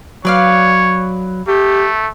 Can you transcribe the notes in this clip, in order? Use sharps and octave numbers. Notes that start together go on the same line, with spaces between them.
F#3 B4 C#5 D5 F5
A3 G4